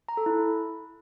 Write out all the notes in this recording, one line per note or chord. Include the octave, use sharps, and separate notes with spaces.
A#5
A4
E4